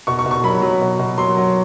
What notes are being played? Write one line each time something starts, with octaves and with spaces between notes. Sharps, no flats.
B2 C#6
C#6
B2
C#6
F#3 B5
F#3
B2
B2
F#3 C6
F#3